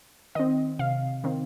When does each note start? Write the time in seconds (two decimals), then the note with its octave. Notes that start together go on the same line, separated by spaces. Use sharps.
0.35 D#3 C4 D#5
0.79 C3 F5
1.24 D#3 C4